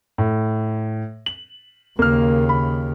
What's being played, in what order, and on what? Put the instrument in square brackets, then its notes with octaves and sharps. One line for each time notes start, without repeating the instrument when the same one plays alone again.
[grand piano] A2
F#7
[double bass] D#2 C#3 [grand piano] A#3 F6
[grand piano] B5